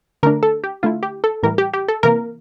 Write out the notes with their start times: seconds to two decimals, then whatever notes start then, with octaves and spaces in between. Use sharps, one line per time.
0.23 D3 A3 D4 A#4
0.43 A4
0.64 G4
0.83 D3 A3 E4 F4
1.03 G4
1.24 A4
1.43 A2 E3 G3 A#4
1.58 G4
1.73 G4
1.88 A4
2.03 C3 E3 A#3 A#4